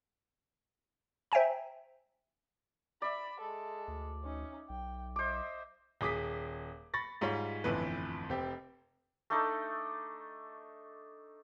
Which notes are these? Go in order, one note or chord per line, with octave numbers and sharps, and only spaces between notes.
C5 E5 G5 G#5 A#5
D5 E5 B5
G#3 A4
D2
C#4 D#4
B1 G5
C5 D#5 E5 D6
D#1 G#4 D6 D#6 B6
B5 C#6 A6 A#6
G#2 G3 F4 C#5 B6
G1 F2 A2 E3 B4
F1 C4 G4
A3 D4 D#4 A4